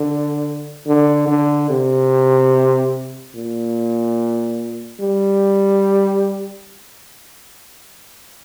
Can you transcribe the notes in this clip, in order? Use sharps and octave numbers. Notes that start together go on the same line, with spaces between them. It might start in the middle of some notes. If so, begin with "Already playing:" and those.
Already playing: D3
D3
D3
C3
A#2
G3